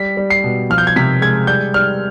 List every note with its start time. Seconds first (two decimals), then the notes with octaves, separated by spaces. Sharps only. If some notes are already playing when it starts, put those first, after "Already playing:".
Already playing: G3 B6
0.17 G3
0.30 C7
0.44 B2
0.70 F3 F6
0.78 G6
0.87 G#6
0.96 C3 B6
1.21 G#3 G#6
1.47 G3 G6
1.74 G3 F6